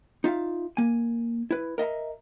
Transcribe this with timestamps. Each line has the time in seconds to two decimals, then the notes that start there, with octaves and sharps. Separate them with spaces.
0.24 D#4 F4 E5 F5
0.77 A#3 G#5
1.51 E4 B4
1.78 A#4 D#5 E5 A#5